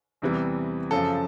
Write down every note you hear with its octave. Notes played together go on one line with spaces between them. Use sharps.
E2 C3 E3 G3
F#2 C#3 F3 A4